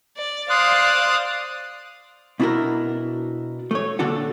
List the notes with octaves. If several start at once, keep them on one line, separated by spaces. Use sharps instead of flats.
D5
C5 D5 F5 C6 D#6 F#6
B2 D4 E4 F#4 A#4
A3 C#5
A#2 D3 D4 F#4 A4 F#5